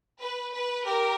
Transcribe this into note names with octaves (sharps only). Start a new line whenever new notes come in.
B4
B4
G4 A#4